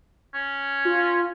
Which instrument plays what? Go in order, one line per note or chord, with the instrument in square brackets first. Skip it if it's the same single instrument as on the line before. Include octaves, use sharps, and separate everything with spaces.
[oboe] C#4
[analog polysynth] F4